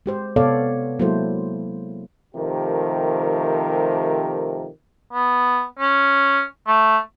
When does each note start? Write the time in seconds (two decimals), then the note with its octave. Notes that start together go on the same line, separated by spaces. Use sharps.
0.06 G#3 G4 C5
0.36 C3 B3 A4 C#5 D5 F5
0.99 F#3 G#3 A#3 E4 A4 C5
2.35 C3 D#3 F3 A3 G4 A#4
5.13 B3
5.79 C#4
6.68 A3